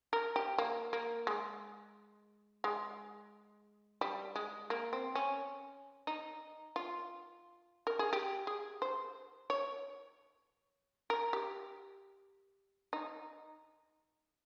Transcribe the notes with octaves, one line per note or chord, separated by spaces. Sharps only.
A#4
G4
A#3
A#3
G#3
G#3
G3
G#3
A#3
C4
C#4
D#4
F4
A#4
G#4
G4
G#4
C5
C#5
A#4
G4
D#4